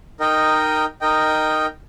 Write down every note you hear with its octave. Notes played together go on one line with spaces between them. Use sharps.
D#4 A#4 D#5 G5
D#4 A#4 D#5 G5